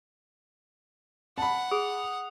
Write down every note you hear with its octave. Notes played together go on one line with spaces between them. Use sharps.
F#5 A5 B5
G#4 D#6